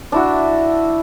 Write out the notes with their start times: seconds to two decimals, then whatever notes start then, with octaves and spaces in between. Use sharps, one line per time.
0.12 D4 E4 F#4